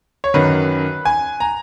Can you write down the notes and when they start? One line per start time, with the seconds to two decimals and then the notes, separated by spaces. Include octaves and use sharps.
0.24 C#5
0.34 F#2 D#3 F#3 B4
1.05 G#5
1.40 A#5